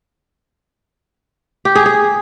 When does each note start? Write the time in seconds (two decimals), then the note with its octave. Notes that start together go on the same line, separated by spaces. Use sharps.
1.65 G4
1.75 G#4
1.86 G#4